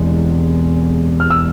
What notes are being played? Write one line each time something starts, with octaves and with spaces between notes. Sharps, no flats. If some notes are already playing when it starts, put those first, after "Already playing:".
Already playing: E1 E2 C3 G#3
F6
E6